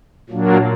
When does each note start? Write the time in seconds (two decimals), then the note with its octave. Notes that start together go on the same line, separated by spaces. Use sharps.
0.29 A#2 F#3 A#3 D4